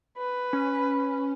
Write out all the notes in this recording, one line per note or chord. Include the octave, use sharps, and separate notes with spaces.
B4
C#4